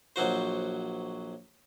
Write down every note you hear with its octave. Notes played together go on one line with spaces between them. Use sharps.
A#1 F#3 F#4 C5